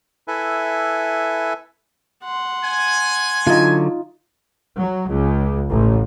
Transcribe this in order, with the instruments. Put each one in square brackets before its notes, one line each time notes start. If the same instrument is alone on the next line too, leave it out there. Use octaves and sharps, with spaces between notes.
[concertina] E4 A4 B4 E5 G#5
[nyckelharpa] F#5 C6
[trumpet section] G#5
[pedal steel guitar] D3 F#3 [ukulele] D#4 F4
[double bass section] F#3
C#2
A1